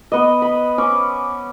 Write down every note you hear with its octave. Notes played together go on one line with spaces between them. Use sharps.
B3 D#5
B5
C#4 D6